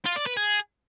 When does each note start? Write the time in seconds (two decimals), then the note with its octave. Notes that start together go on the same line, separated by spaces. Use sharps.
0.06 F4
0.16 D5
0.26 B4
0.37 G#4